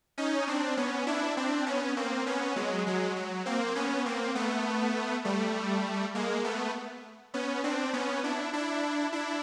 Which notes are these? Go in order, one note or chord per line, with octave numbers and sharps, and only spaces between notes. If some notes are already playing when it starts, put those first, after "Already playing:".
C#4 D#4
C4 D4
B3 C#4
D4 E4
C4 D4
B3 C#4
A#3 C4
B3 C#4
F#3 G#3
F#3 G#3
F#3
A#3 C4
B3 C#4
A#3 C4
A3 B3
G3 A3
G#3 A#3
A3 B3
B3 C#4
C4 D4
B3 C#4
D4 E4
D4 E4
D4 E4